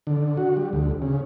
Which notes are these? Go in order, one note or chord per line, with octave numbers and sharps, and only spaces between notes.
D3
F#4
G3
D2
C#3